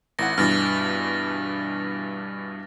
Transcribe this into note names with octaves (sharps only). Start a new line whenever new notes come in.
G#1 E4 F#5 A#6
G2 B2 E3 F6 A6 A#6